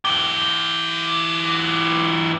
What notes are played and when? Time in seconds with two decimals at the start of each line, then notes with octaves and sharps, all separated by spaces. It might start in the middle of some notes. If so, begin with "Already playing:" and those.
0.05 E3 G4